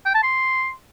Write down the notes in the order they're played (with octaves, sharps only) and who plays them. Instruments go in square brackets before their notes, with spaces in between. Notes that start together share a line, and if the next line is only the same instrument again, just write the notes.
[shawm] G5
A5
C6